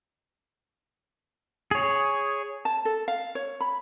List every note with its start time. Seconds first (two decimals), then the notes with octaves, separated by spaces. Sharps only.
1.71 G#4 C#5
2.65 A5
2.85 A4
3.08 F5
3.35 C#5
3.61 B5